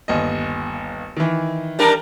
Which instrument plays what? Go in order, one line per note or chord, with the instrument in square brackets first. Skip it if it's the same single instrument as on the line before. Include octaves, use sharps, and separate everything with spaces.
[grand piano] G1 D#2 D#5
D#3 E3
[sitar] G3 D4 A#4